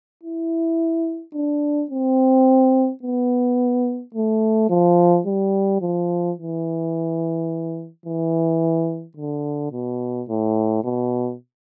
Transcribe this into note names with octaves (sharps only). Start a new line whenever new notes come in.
E4
D4
C4
B3
A3
F3
G3
F3
E3
E3
D3
B2
A2
B2